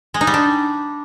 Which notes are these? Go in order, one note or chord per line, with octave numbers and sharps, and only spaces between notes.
G#3
D#4
G3
D4